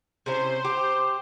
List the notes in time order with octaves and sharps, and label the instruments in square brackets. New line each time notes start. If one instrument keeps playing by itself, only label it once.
[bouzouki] C3 C#4 E4 [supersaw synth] C5
[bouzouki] G4